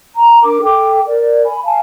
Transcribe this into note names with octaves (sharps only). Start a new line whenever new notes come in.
A#5
D4 A#4 D6
A4 G5 D6
A#4 D5
G#5 B5
F5 G#5 A5